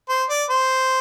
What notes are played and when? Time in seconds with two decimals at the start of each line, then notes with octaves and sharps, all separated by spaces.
0.09 C5
0.30 D5
0.50 C5